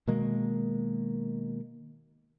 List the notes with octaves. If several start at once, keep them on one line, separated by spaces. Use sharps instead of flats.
B2 D#3 G#3 A#3